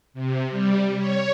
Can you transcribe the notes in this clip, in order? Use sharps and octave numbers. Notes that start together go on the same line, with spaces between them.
C3
G3
C#5